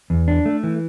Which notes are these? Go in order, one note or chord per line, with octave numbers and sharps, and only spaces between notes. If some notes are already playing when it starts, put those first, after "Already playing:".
E2
D4
A3
E3